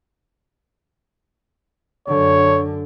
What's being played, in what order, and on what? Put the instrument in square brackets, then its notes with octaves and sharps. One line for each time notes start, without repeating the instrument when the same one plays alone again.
[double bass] F#2 D3 [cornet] C#5